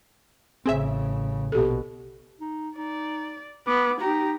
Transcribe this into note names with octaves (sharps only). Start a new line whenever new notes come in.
A1 C#3 C4 G#4 E5
A#1 B2 G4 A4
D#4
D#4 D5
B3 D6
D#4 G4 A#5